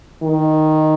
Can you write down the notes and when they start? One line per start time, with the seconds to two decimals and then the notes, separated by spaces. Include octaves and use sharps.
0.23 D#3